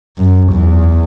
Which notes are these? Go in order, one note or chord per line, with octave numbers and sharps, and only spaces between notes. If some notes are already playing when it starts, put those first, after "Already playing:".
F#2
E2